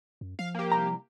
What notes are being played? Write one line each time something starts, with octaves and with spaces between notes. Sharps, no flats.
F#2
F3 F5
A#3 G4
C2 A#5